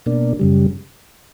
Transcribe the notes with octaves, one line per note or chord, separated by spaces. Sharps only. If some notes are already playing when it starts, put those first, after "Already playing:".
B2 A#3 D4
F#2 C#3 G3